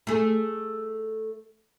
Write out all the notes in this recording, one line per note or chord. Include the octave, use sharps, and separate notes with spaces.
A3 G#4